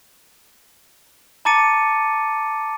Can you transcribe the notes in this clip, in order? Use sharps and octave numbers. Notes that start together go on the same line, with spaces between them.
A5 A#5 D6 A6 C#7 D#7